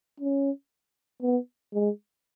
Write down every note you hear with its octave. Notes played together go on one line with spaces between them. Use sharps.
C#4
B3
G#3